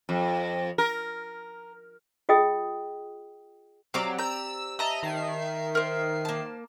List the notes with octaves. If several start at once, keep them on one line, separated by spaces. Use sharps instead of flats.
F2
A#4
F4 G#4 D#5 G5 D#6
F#3 C4 G4 D5 F5 A#5 D6
A#5 E6 G6
D#5 E5 A5 A#5 E6
D#3 C7
A#4 C5
A#3 A5